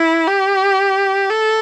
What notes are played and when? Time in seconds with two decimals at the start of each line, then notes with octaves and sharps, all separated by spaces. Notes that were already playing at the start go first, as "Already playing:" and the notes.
Already playing: E4
0.27 G4
1.30 A4